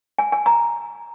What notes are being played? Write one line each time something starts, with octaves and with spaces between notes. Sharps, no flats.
G#5
G#5
A#5